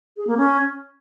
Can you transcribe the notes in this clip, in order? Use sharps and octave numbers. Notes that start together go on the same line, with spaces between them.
G#4
A#3
C#4